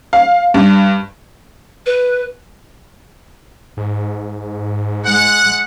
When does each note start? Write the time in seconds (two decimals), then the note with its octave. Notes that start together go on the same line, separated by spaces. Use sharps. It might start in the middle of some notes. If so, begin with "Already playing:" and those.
0.13 F5
0.54 G2
1.86 B4
3.77 G#2
5.05 G#3 F#5